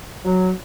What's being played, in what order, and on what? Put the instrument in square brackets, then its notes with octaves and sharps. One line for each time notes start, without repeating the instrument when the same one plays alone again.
[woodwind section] F#3